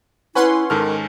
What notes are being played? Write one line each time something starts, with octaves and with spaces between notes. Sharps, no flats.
C#4 E4 B4 F#5 C6
G#2 D#3 A4 A#4 F6